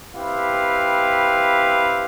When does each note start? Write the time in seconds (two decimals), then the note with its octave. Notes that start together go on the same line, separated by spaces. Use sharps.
0.16 C4 E4 G4 B4 F5